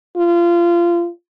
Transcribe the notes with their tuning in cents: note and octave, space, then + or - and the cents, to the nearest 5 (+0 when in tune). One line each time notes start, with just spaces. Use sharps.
F4 -25